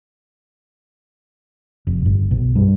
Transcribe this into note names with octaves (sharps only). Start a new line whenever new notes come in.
F1
G1
B1
G2